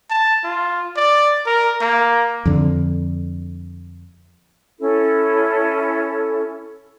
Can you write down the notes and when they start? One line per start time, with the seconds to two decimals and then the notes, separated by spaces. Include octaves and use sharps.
0.10 A5
0.44 F4
0.96 D5
1.46 A#4
1.81 A#3
2.46 F2 D3
4.80 C#4 E4 A4